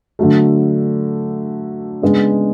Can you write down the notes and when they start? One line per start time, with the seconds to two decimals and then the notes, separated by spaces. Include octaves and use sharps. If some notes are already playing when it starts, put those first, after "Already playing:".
0.19 D3 F#3 A3
2.02 C#3 G#3 B3 D4 G#4